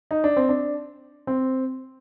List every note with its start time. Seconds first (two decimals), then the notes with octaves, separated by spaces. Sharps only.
0.11 D#4
0.24 D4
0.37 C4
0.49 D4
1.27 C4